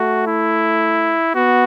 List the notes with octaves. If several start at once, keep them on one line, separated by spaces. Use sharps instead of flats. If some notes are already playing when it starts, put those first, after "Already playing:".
Already playing: A3 F#4
E4
B3 F#4